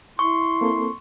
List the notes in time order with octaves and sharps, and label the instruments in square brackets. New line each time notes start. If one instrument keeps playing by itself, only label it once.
[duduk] E4 [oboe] C6 [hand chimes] C#6
[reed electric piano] A#3 C4 A4